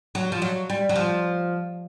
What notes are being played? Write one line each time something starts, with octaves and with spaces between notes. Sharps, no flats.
F#3
F3
F#3
G3
F#3
F3